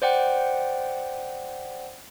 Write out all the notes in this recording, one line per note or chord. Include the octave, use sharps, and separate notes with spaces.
C5 D5 F#5 G5